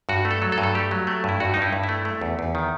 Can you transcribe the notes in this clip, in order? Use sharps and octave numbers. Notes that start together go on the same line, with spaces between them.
G2 F#4
A3
A4
F#3
A4
G2
A4
A3 G4
F#3
A3
G2 E4
G2 F#4
D#4
G2 E4
G2
E4
A3
A3
E2
E2
D#3